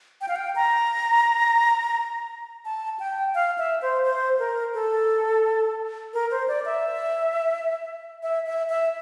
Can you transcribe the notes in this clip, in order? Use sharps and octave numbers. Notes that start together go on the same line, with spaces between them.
G5
F5
G5
A#5
A5
G5
F5
E5
C5
C5
A#4
A4
A#4
C5
D5
E5
E5
E5
E5